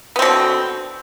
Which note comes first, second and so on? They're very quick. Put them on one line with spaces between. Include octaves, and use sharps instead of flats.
B3 C4 B2 D3